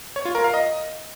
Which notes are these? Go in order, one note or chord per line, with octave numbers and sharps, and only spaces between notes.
C#5
F4
A#4
F5
D#5